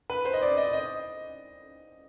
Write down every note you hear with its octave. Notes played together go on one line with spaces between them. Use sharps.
B4
C5
D#5
D5
D#5
D#5